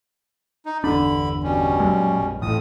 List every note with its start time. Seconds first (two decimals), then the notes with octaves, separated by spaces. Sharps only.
0.66 D#4
0.84 G1 E2 D3 D4 B5
1.43 B2 G3 C#4
1.80 F#2 A#2 G#3
2.18 A#1
2.42 A1 F2 A2 D#6